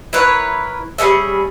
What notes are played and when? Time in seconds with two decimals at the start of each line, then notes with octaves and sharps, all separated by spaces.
0.13 E4 A#4 B4 C#5
0.98 G3 C#4 G#4 E5